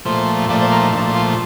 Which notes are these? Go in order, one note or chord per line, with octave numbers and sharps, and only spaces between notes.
A#2 F3 A3 C5
A#2 F3 A3 D5
C5
A#4
D#4
A#2 F3 A3 D4
F4